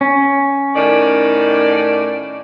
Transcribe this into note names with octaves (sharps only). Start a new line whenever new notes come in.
C#4
A2 D#3 D5